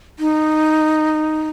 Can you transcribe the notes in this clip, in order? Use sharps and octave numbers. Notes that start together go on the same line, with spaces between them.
D#4